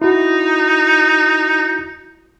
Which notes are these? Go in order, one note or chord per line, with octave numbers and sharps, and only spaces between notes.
D#4 E4 F#4